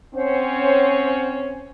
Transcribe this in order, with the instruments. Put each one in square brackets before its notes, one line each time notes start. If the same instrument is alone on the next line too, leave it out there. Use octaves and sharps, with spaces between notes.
[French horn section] C4 C#4 [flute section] C5 C#5 F#5